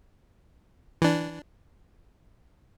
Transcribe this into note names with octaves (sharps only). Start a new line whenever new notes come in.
E3 D4